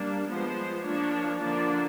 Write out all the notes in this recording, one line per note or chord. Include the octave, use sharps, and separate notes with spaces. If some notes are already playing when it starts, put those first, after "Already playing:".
Already playing: G3 A#3 D4
F3 G#3 B3 C5
F3 A#3 D4 C#5
D3 F3 A#3 D4 D5